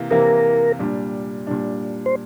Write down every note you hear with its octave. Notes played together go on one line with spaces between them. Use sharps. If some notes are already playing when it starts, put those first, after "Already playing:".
Already playing: C3 E3 A#3
C3 E3 A#3 A#4
A#2 G3 D4
A#2 G3 D4
C5